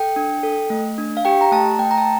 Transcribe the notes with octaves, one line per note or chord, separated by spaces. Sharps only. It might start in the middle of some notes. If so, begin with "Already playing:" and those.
Already playing: A4 G5
D4
A4
A3
D4
F5
G4 G5
A#5
A3 A5
A3 G5
A#5
A5